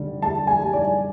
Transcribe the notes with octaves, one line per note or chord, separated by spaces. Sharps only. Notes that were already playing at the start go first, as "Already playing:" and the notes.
Already playing: D3 G3
G3 A5
G#5
G3
D5